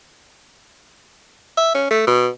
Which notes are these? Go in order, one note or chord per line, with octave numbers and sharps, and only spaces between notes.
E5
C#4
A3
B2